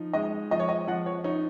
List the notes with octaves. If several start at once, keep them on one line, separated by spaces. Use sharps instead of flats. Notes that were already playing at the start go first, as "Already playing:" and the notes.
Already playing: F3 D#4
G#3 D#5
F3 D#5
C#5
D#5
F3 F#5
C#5
D#4 C#5